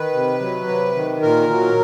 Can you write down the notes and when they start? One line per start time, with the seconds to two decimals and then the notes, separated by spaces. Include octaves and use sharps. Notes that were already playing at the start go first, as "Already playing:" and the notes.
Already playing: D#3 B4
0.13 C3
0.40 F#3
0.68 C3
0.95 D#3
1.22 A#2 A#4
1.50 F#3